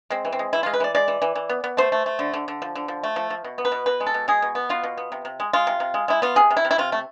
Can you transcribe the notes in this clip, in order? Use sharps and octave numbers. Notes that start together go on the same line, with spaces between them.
G#3 C4
E3
C4
G#3
E3 E4
G#3 F4
B4
E3 D5
G#3 D5
E3
E3
E3
B3
B3
A3 C5
A3
A3
D3
D3
D3
F3
D3
F3
A3
F3
F3
B2
B3
B4
B2
B2 B4
G#3
A4
B2
G#3 G#4
B2
B3
B2 F4
B2
B3
C3
C3
G#3
G#3 F4
C3
C3
G#3
G#3 E4
B3 F4
C3 G#4
C3
E4
C3
E4
C3 F4
A3